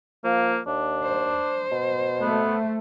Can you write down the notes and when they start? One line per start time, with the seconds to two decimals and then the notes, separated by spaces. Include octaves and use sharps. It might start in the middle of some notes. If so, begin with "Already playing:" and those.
0.24 F3 A#3
0.67 D#2 D4
1.03 C5
1.72 B2
2.21 A3 B3